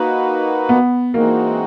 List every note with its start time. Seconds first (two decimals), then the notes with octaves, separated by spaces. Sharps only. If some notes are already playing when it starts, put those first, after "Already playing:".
Already playing: A#3 D#4 F#4 B4
0.69 B3
1.14 E3 G#3 A#3 C4 D#4 F#4